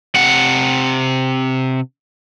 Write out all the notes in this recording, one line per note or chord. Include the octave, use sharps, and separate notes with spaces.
C3 F#5